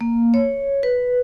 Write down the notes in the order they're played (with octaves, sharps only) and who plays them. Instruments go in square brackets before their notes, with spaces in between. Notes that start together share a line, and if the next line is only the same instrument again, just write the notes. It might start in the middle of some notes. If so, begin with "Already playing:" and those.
[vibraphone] A#3
C#5
B4